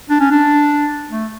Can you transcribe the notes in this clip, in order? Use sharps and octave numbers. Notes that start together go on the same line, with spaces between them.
D4
C#4
D4
A3